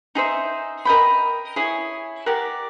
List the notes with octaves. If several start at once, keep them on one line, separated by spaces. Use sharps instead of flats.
D#4 G#4 C5 E5
A#4 D#5 G5 B5
E4 G#4 C#5
G4 A#4 D5 F#5